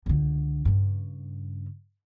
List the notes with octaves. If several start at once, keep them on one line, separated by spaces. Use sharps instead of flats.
C#2 D3
G2 C#3